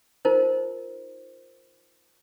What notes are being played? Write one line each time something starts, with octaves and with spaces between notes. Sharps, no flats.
D#4 F4 A#4 C5